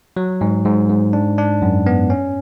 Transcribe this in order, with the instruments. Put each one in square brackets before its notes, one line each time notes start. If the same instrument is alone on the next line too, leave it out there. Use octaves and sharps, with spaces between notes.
[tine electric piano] F#3
G#2
G#2
G#2
D4
D4
F#2
B3
C#4